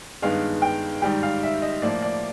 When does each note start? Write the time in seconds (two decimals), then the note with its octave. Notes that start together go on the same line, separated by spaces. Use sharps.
0.22 G2 D#3 G#3 B3 F5
0.62 G5
1.02 G#2 D#3 G3 G5
1.23 F5
1.43 E5
1.62 D#5
1.82 A2 F3 A#3 D5
2.02 D5